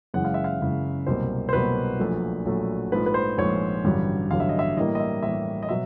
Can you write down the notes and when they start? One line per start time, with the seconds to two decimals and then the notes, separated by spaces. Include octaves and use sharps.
0.14 F#1 F#2 C#3 E3 G#3 F#5
0.25 F5
0.34 E5
0.44 F5
0.61 F#1 F#2 C#3 E3 G#3
1.07 C2 B2 F#3 A#3 C5
1.49 C5
1.53 C2 B2 F#3 A#3 B4
2.00 A#1 A#2 F#3 A3
2.45 A#1 A#2 F#3 A3
2.92 A#1 G#2 F3 A3 B4
3.06 B4
3.14 C5
3.38 A#1 G#2 F3 A3 C#5
3.84 A1 G2 D3 F#3
4.31 A1 G2 D3 F#3 F5
4.40 E5
4.49 D#5
4.59 E5
4.77 A2 E3 G3 A#3 D#5
4.95 D#5
4.99 E5
5.22 A2 E3 G3 A#3 E5
5.63 D#5
5.69 B2 F#3 E5